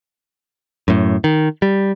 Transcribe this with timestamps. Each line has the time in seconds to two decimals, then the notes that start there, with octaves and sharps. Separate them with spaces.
0.88 F#2 A2
1.24 D#3
1.62 G3